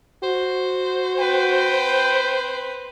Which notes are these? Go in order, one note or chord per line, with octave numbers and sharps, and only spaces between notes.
F#4 C5
C4 B4 G5